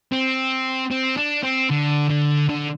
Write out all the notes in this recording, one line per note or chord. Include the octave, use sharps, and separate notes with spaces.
C4
C4
D4
C4
D3
D3
D3